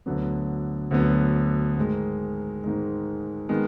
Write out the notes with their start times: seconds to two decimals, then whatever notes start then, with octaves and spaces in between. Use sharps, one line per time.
0.06 D2 D3 F#3 B3
0.91 D2 D3 F#3 B3
1.77 G#2 D#3 G#3
2.64 G#2 D#3 G#3
3.49 D#3 G#3 B3